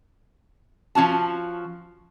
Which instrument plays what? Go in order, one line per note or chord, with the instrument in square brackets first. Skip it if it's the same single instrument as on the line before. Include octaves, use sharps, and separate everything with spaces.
[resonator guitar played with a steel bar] F3 C#4 F#4 A5